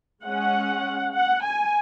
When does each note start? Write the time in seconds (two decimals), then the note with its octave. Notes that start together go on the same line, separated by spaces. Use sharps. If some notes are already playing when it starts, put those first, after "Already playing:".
0.24 G#3 C#4 F#5
1.13 F#5
1.43 G#5